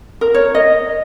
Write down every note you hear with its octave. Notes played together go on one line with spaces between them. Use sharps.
A#4
C#5
D#5